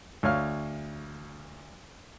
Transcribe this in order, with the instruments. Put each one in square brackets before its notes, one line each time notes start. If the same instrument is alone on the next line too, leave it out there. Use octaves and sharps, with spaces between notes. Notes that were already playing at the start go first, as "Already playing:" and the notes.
[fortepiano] D2 C#5 F5 F6